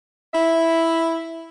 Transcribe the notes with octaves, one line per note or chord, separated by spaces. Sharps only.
E4 E5